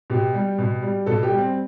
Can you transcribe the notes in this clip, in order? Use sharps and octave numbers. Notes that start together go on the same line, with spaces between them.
B2 G4
G3
B2
G3
B2 A4
G4
G3
C4